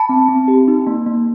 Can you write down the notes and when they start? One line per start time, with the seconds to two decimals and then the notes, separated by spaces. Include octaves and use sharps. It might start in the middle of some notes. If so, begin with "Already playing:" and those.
Already playing: A5 B5
0.09 C4
0.28 C4
0.48 G4
0.68 D#4
0.87 A#3
1.06 A#3